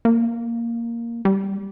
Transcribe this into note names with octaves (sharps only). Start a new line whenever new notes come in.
A#3
G3